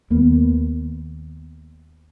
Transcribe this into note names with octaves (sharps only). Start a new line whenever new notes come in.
D#2 A#3 B3